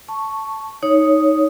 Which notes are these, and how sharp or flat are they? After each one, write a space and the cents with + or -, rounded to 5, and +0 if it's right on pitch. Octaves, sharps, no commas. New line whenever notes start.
A5 +0 C#6 +0
D#4 +10 C#5 +0 D#6 +0